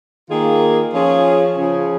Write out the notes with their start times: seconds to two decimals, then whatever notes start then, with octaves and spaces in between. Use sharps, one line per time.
0.30 D#3 A#3 F4 G#4
0.93 F3 C#4 F4 G#4
1.56 C#3 F3 C#4 F4 G#4